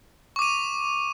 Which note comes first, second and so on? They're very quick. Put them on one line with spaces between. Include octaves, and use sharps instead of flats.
C#6 D6 D#7